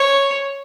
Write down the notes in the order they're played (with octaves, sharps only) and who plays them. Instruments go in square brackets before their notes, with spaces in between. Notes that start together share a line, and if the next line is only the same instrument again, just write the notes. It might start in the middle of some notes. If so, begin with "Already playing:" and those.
Already playing: [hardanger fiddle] C#5